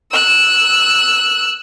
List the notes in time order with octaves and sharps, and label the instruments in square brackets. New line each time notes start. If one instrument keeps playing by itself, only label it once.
[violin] E6 F#6